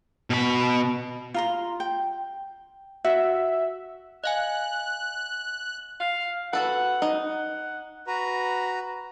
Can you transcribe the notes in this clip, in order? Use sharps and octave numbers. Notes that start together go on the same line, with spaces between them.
B2 B5
F4 A#5 C6
G5
F#4 E5
D#5 F5 G#5 F#6
F5
F#4 A4 B4 F#5
D#4
F#5
F#4 B4 A#5